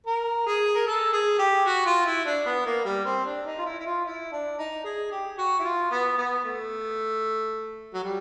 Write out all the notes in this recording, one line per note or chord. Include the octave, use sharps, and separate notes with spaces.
A#4
G#4
A#4
A4
G#4
G4
F#4
F4
E4
D4
B3
A#3
G3
C4
D4
D#4
F4
E4
E4
F4
E4
D4
D#4
G#4
G4
F#4
E4
F4
B3
B3
A3
F#3
G3